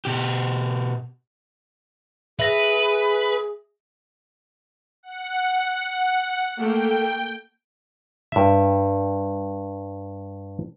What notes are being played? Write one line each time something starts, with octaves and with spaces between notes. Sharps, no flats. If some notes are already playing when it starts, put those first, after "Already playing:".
B2 G4
G#4 B4 E5 A#6
F#5
A3 A#3 G5
G2 E5